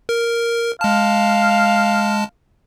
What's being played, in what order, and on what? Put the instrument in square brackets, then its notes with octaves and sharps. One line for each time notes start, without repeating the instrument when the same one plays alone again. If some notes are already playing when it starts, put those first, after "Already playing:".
[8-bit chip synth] A#4
[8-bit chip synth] G#3 A5 [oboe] F5